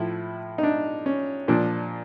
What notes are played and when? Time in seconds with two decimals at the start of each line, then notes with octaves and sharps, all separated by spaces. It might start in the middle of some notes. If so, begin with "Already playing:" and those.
Already playing: A2 F3 E4
0.58 D#4
0.63 D4
1.06 C#4
1.48 A#2 F3 D4